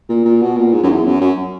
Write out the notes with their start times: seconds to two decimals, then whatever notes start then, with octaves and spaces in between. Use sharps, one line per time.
0.09 A#2
0.25 A#2
0.42 B2
0.57 A#2
0.73 G#2
0.83 F#2
0.89 E2
1.05 F#2
1.21 F#2